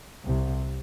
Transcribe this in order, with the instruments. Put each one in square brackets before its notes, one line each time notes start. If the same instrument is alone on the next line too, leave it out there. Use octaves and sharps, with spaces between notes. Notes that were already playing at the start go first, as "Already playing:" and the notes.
[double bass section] C2 C3